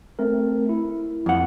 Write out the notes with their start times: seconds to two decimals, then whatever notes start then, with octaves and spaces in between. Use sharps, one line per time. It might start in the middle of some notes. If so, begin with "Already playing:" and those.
0.19 A3 C4 A#4
0.69 E4
1.26 F2 F#5